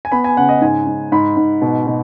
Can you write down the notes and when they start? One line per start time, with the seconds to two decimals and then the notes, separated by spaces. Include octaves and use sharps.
0.05 G#5
0.12 B3 B5
0.24 G#5
0.37 C#3 F#5
0.49 D#5
0.61 G#2 G#5
0.87 G#2
1.12 G#2 B5
1.37 G#2
1.62 B2
1.87 B2